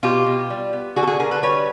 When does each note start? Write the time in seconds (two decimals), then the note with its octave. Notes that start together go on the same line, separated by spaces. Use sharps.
0.03 B2 F4 G4
0.26 B2
0.50 G3
0.73 B3
0.96 D3 F#4 G#4
1.03 A4
1.07 F#4 G#4
1.19 D3 G#4 A#4
1.31 A4 B4
1.43 G3 B4 C#5